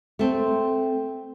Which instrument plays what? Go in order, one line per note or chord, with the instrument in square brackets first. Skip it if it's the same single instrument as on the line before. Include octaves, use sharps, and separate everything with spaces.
[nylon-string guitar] A3 C4